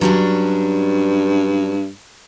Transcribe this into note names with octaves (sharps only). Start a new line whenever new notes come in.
G2 F#3 C#4 D4